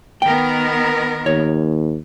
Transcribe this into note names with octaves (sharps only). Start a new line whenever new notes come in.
D#3 B3 A#4 G5
D#2 C#5